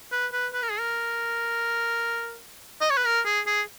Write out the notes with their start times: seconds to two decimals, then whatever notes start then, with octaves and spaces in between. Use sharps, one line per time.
0.12 B4
0.33 B4
0.53 B4
0.62 A#4
0.70 G#4
0.80 A#4
2.81 D#5
2.90 C#5
2.97 B4
3.05 A#4
3.25 G#4
3.46 G#4